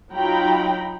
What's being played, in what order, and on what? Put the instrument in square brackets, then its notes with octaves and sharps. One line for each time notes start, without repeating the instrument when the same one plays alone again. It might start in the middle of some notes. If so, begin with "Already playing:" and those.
[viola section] F#3 D#4 F4 G5 A#5 B5